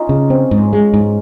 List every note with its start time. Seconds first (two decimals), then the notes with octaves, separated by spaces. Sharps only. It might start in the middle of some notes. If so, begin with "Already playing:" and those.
Already playing: C#4 D#4 F4
0.09 C#3
0.30 C4
0.51 G#2
0.73 G#3
0.94 G#2